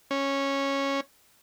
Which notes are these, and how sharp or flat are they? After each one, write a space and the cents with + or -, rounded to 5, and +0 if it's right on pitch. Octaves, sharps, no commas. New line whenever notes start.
C#4 -10